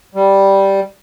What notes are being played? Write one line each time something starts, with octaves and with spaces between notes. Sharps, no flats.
G3